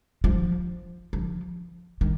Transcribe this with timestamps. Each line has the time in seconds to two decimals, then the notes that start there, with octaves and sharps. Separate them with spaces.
0.24 F3
1.13 F3
2.01 D#3